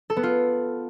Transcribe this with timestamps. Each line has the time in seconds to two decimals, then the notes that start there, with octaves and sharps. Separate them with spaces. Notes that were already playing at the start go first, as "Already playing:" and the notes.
0.10 A4
0.17 B3
0.23 F4